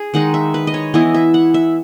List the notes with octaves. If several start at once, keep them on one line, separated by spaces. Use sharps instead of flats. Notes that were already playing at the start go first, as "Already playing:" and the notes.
Already playing: G#4
D#3 G#3 D#4 F#5
E5
B4
D#5
C#5
E3 B3 E4 D#5
E5
F#5
E5